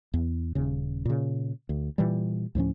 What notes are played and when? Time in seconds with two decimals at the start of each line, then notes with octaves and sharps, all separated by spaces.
0.14 E2
0.55 D#1 C#3
1.05 A#2 C#3
1.69 D2
1.98 A#2 E3 G3
2.55 D2 A2 F3 C#4